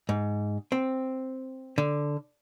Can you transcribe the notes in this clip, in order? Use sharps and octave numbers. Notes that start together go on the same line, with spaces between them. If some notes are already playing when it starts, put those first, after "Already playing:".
G#2
C4
D3